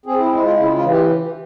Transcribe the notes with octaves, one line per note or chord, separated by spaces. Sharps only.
C4 G#4
E4
G#3 E4
F4
C#3 E4
F4
E3
G4